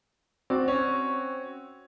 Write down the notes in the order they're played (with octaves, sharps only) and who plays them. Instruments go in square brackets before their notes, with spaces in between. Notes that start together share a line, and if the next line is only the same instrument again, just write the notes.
[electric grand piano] C4 F#4 [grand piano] D5
[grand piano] C#4